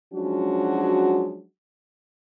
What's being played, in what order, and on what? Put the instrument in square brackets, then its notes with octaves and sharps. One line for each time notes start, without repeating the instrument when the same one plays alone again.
[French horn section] F3 F#3 G#3 C#4 D4 F#4